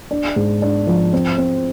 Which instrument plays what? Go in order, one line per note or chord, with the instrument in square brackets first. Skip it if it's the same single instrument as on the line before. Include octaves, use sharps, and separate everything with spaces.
[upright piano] D4
G#2
D4
F3
C4
C4